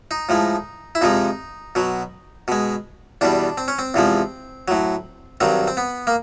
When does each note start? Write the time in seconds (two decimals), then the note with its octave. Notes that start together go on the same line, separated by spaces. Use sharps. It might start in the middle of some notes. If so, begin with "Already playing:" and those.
0.11 D#4
0.29 A2 F3 G#3
0.95 E4
1.01 F2 C3 F3 G#3 D#4
1.75 B2 F#3
2.48 B2 G#3
3.21 E2 B2 G3 D4
3.58 C4
3.68 C#4
3.79 C4
3.94 E2 C3 F3 G#3
4.68 A2 F#3
5.40 G2 D#3 F#3 C4
5.68 C4
5.77 B3
6.07 A#3